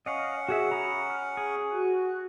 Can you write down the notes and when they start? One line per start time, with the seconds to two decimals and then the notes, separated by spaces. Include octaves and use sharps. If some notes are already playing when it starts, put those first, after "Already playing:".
0.06 C#4 D#5 F5 F#5
0.49 F#4 G#4 E5
0.71 A#5 B5 D#6
1.10 F6
1.37 G#4
1.71 F#4 F#6